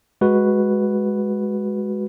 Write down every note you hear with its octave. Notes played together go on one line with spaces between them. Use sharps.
G#3 F#4 B4